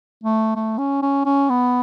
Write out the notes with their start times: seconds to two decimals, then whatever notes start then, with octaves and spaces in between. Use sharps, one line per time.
0.23 A3
0.55 A3
0.78 C#4
1.02 C#4
1.25 C#4
1.50 B3